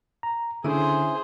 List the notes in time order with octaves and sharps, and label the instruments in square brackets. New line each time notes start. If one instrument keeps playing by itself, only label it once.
[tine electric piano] A#5
[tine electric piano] D3 [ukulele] C#4 E4 [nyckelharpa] G#4 C5